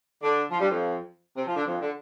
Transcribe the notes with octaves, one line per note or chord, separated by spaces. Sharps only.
D3 D4
F3 F4
G2 G3
F2 F3
C3 C4
F3 F4
D3 D4
F2 F3
D3